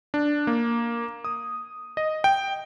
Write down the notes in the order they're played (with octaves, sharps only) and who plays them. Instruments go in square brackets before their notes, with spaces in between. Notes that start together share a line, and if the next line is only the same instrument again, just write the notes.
[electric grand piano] D4
A#3
D#6
D#5
G5